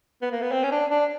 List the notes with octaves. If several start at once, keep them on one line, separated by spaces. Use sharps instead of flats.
B3
A#3
B3
C4
C#4
D4
D4